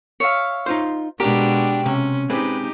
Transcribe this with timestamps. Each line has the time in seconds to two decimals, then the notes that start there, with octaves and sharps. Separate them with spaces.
0.20 C#5 E5 F5
0.66 D#4 F4 C5
1.20 B2 G#3 D4 G4 A#4
1.86 C3 C#4
2.30 G#3 C4 D#4 G4 B4